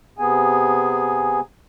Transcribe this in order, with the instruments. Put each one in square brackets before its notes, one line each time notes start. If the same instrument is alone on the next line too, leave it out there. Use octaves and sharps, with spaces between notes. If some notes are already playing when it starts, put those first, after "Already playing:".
[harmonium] C3 B3 G#4 G#5